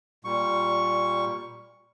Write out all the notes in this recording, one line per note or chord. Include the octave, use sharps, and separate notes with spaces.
A#2 G3 C#6